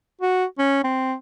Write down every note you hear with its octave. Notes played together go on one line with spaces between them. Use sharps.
F#4
C#4
C4